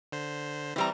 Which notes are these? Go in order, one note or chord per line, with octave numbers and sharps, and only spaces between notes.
D3 C5
E3 G3 C4 A#5